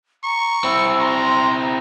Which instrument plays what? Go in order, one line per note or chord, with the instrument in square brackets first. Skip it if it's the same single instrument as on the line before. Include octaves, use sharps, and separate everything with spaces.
[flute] A#5 [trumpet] C#6
[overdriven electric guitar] C4 E4 [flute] E6
[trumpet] A#5 [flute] C6